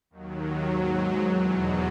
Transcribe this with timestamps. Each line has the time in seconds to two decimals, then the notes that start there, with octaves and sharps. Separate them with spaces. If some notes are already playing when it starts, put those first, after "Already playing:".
0.10 D#2 D#3 F#3
0.67 G#2 F#3
1.23 E2 B2 F#3